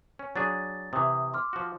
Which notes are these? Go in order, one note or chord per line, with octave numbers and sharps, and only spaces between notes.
C#4
F#3 D4 G#4 A6
C3 E3 D#6
C6 D6 F6
F3 F#4